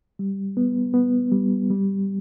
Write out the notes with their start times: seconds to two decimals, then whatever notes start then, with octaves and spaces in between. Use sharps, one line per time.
0.19 G3
0.57 B3
0.94 B3
1.32 G3
1.70 G3